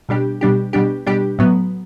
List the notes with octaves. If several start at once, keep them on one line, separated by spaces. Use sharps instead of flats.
B2 G3 D4 G4
B2 G3 D4 G4
B2 G3 D4 G4
B2 G3 D4 G4
A2 F#3 B3